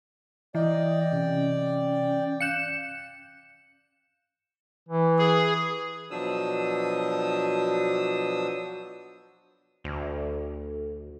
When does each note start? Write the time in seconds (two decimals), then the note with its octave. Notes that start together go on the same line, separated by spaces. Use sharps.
0.55 E3 D5 D#5 G5
1.12 C3 C#4
2.40 F5 F#6 G6 C#7 E7
4.89 E3
5.19 G#4
6.11 B2 F3 F#3 D4 D#6 E6
9.84 D2